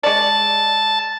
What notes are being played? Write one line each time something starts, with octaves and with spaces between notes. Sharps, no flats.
G#3 C#5 D5 A5